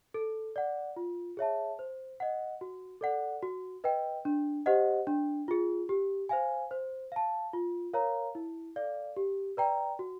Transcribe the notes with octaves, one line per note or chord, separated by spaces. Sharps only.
A4
D5 F#5
F4
G#4 C#5 E5 A5
C5
D#5 F#5
F#4
A4 D5 F#5
F#4
B4 D#5 G5
D4
G4 C5 D#5 F#5
D4
F4 G#4
G4
C5 F5 G#5
C5
F5 A5
F4
A#4 C#5 F5 A#5
E4
A4 D5 F5
G4
B4 D5 G5 A#5
F#4